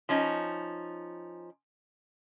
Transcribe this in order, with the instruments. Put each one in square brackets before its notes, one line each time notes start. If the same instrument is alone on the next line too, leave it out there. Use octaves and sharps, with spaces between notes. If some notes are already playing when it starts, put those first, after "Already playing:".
[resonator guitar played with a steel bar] F3 C#4 D#4